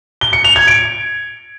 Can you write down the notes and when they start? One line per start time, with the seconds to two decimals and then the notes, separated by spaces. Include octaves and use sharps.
0.21 G7
0.33 C#7
0.44 F7
0.56 G#6
0.67 D7